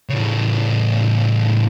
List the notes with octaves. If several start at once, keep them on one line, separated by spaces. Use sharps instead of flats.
A2 C#3